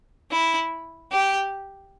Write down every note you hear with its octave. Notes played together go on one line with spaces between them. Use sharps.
E4
G4